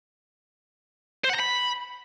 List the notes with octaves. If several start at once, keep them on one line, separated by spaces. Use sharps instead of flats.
C5
F#5
A#5
B5